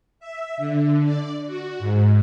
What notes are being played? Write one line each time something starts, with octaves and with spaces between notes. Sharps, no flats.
E5
D3
D5
F#4
G#2